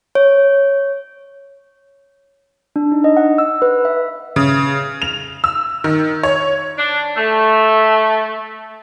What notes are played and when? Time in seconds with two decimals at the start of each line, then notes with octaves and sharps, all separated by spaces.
0.15 C#5
2.76 D4
2.92 D#4
3.04 D#5
3.17 F#5
3.38 E6
3.62 B4
3.85 E5
4.36 C#3
5.02 F7
5.44 E6
5.84 D#3
6.23 C#5
6.78 D4
7.17 A3